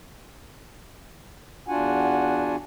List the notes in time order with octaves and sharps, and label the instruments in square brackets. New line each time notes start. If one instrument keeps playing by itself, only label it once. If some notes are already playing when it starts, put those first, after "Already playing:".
[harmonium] E2 D4 F4 F#4 F#5 G#5